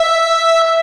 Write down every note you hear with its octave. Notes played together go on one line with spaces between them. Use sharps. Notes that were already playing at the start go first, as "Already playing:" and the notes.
Already playing: E5